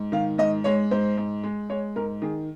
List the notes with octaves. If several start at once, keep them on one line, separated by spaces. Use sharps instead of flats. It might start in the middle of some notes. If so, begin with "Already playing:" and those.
Already playing: G#2
D#3 F5
G#2 D#5
G#3 C#5
G#2 C5
G#2
G#3
G#3 C#5
G#2 A#4
D#3 G#4